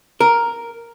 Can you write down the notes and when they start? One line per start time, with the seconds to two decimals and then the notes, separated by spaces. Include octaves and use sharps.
0.21 A#4